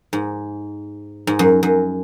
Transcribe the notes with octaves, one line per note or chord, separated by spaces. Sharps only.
G#2
G#2
F#2
F#2